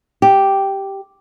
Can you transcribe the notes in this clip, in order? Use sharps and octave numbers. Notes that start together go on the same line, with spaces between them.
G4